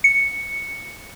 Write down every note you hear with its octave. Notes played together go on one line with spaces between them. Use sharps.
C#7